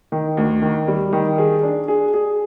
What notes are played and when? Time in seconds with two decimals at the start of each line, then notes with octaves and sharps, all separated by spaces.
0.12 D#3
0.37 D2
0.62 D#3
0.88 G3
1.13 D#3
1.38 G#4
1.63 D4
1.88 G#4
2.14 G#4